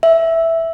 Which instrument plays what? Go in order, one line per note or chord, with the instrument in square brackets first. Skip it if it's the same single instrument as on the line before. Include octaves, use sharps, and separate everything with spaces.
[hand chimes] E5